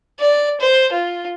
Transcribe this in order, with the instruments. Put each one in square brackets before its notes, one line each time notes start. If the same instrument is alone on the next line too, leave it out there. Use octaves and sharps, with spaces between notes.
[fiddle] D5
C5
F4